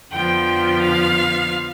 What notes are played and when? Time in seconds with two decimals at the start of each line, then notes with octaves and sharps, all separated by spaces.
0.11 F2 D3 F3 B3 G5
0.81 F5